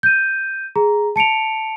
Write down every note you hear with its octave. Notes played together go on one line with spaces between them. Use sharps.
G6 D#7
G#4 A#5
A5 C#7 D7 F7